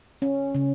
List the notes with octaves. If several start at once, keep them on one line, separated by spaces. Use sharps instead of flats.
C#4
C#3